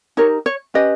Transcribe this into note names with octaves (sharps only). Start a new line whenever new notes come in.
D#4 G4 A#4 C#5
C#5
C#4 G4 B4 D#5